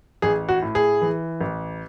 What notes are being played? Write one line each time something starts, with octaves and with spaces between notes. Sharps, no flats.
A1 G#4
F#4
A2
G#4
E3
A1